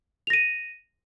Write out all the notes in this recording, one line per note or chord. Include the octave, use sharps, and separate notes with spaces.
A#6 D#7 F7